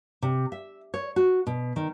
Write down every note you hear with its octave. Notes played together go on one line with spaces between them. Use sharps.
C3
E5
C#5
F#4
B2
D#3